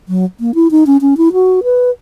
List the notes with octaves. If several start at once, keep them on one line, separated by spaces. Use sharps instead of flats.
F#3
A#3
E4
D#4
C#4
C#4
E4
F#4
B4